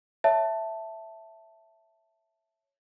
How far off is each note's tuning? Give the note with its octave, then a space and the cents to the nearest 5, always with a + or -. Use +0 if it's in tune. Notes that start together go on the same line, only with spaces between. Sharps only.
C#5 +0 E5 +0 A5 +0